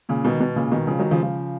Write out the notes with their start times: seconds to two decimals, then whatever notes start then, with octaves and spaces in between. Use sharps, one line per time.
0.09 A#2 C#3
0.25 B2 D#3
0.41 B2
0.56 A#2 C#3
0.72 B2 D#3
0.87 C#3 F3
0.99 D#3 F#3
1.11 C#3 F3
1.22 C#3 F3